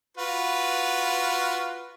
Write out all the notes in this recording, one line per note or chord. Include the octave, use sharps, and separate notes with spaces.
F4 F#4 B4